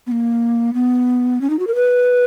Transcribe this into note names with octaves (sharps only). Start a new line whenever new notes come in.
B3
A#3
B3
C#4
D#4
F#4
A#4
B4